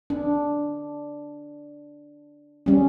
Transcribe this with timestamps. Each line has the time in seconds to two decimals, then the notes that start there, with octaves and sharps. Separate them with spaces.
0.10 D4
2.66 G3 C#4